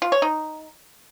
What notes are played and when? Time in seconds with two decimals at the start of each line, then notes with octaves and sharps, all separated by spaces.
0.02 F4
0.12 C#5
0.22 D#4